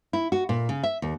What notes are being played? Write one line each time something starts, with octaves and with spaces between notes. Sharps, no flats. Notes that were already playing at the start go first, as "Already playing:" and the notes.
E4
F#4
A#2
C#3
E5
D#2